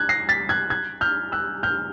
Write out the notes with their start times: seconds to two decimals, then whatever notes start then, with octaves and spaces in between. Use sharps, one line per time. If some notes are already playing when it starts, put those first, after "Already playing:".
Already playing: F#6 G#6
0.09 A#6 C7
0.29 A6 B6
0.49 F#6 G#6
0.70 F#6 G#6
1.01 F6 G6
1.32 E6 F#6
1.63 F6 G6